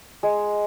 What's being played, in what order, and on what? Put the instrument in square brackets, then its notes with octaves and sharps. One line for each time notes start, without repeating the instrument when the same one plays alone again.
[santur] G#3